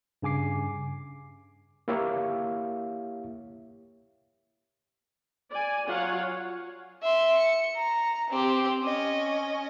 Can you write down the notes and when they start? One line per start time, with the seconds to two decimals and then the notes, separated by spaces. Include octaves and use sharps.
0.22 G2 C#3 G#5 D6 C7
1.88 A#3 E4 G4 C#5 E5 F5
5.52 D5 G#5
5.87 F#3 F4 C#5 F5 F#5
7.03 E5 C6
7.37 C#7
7.76 A#5
8.30 C4 G4
8.82 C#4 D#5